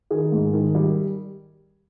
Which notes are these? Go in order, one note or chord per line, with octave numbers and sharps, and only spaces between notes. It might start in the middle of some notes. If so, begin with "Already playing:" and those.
D#3 G#4 A#4
G#2
D#3
G3